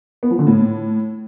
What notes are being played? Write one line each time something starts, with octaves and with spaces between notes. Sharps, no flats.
B3
F3
D3
A2